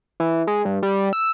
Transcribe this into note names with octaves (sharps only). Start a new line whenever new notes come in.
E3
G#3
G2
G3
E6